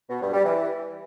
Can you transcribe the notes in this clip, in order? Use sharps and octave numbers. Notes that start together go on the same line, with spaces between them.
B2
G2
G3
E3